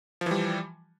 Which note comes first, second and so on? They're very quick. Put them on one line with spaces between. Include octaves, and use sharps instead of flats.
F3 E3 G3